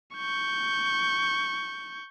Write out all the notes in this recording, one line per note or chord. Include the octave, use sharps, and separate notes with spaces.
C#6 G6